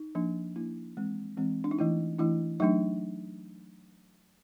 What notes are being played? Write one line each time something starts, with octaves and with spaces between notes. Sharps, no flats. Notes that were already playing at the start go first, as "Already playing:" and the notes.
Already playing: D#4
F3 A#3 D4
F3 A#3 D4 E4
E3 G#3 C4
E3 G#3 C4
D4
D#4
E3 A3 D4 E4
E3 A3 D4 E4
F#3 A3 D4 D#4